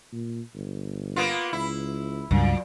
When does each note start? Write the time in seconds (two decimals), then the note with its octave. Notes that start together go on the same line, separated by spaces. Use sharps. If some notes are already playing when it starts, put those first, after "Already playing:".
0.12 A#2
0.55 G1
1.16 A#3 B3 F4
1.53 C#2 E4
2.31 C#2 G2 A#2 F#3